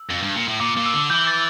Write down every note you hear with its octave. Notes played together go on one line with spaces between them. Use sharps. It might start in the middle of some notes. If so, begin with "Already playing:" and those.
Already playing: E6
F2
G2
A#2
A2
A#2 D6
A#2
E6
D3
E3 G6
A6